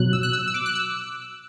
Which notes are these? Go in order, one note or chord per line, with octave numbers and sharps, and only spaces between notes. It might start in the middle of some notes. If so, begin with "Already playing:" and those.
Already playing: B2 F#3 F#6
E6
F#6
E6
E6
D6
F#6
E6